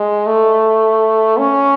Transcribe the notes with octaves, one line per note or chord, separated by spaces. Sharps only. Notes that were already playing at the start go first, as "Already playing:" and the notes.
Already playing: G#3
A3
C#4